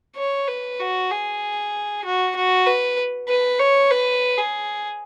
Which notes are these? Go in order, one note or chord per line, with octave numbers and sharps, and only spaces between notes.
C#5
B4
F#4
G#4
F#4
F#4
B4
B4
C#5
B4
G#4